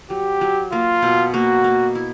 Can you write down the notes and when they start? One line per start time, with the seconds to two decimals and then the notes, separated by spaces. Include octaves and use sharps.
0.10 F#3 G4
0.41 F#3
0.72 A#3 F4
1.02 B2
1.34 A#3 F#4
1.64 A#3
1.95 E4